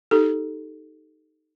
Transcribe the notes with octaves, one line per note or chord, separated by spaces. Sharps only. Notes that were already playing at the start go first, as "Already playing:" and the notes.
D#4 G4 A4